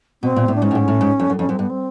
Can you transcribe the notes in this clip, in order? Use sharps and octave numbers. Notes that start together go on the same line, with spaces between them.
B2 C4
A#2
A2
D4
G#2 C#4
A2
G#2
A2
G#2
F2
F#2
F2 C#4
F#2 C4
G2 B3
C4